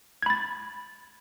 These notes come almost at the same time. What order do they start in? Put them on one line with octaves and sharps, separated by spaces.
G#6 B5 A6